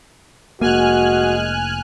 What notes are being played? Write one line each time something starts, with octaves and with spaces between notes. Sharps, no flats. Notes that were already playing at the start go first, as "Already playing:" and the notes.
F1 G#3 A#3 F#4 G#5 F6 F#6